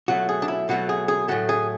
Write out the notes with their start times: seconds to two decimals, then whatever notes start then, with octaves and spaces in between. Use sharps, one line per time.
0.08 B2 F#3 A3 F#4
0.29 G#4
0.42 D4
0.48 E4
0.69 B2 F#3 A3 F#4
0.89 G#4
1.08 G#4
1.28 A2 F#3 A3 F#4
1.49 G#4